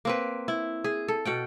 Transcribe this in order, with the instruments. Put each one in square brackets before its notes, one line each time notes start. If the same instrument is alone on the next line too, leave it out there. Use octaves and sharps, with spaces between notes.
[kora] A#3 C4 B4
E4
G#4
A4
B2 F#5 G5